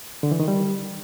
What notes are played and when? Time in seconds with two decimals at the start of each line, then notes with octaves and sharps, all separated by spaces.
0.23 D3
0.31 E3
0.40 D#3
0.48 G3